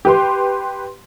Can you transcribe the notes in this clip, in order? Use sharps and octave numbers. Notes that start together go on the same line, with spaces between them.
G4 B4 C6